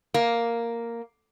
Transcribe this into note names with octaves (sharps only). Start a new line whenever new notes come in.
A#3